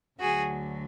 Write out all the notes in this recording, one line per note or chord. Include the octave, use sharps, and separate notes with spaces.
D2 D3 F#3 F#4 G#4